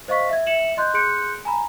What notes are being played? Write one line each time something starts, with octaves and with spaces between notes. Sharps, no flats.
C5 D#5 F5 C#6 B6
E5 G#6
E5 C#7 E7 F#7
D#5 C6 F#6 G6
G#4 C6 F#6 G6 C#7 D7
G#5 A#5 B5